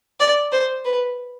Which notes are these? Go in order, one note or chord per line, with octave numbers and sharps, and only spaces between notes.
D5
C5
B4